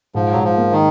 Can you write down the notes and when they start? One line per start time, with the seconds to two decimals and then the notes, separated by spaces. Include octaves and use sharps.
0.15 G#2 F3
0.32 G#2 F#3
0.43 F3
0.57 A#3
0.72 D#3